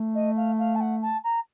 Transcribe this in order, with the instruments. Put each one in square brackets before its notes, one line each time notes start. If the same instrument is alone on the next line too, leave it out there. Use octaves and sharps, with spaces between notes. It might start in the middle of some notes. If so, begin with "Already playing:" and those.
Already playing: [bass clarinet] A3
[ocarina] D#5
F5
F5
A5
F#5
A5
A#5